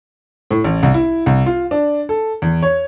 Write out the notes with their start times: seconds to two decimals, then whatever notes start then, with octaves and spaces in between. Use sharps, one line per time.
0.51 A2
0.64 A1
0.83 C2
0.94 E4
1.26 C2
1.46 F4
1.71 D4
2.09 A4
2.42 E2
2.62 C#5